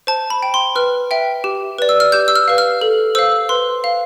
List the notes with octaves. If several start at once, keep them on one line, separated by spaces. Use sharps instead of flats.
C5 A5
B5
G5
C6
B4 F6
E5 G5
G4
B4 D5
E6
F6
G4 G6
E6
F6
B4 F5
F6
A4
C5 F5 E6
B4 C6
F5